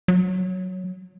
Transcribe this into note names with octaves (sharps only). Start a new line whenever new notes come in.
F#3